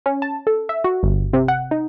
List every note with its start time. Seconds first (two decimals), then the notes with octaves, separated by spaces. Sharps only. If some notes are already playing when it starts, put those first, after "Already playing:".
0.06 C#4
0.22 A5
0.47 A4
0.69 E5
0.84 F#4
1.03 G1
1.33 C3
1.48 F#5
1.71 D#4